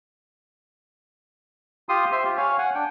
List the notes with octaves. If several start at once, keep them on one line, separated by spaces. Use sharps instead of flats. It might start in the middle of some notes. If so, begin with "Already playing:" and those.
F4 G4 C6 D#6
C5 E5 C6
F4 G4
C#5 F5 G#5
F#5 G#5
D4 G5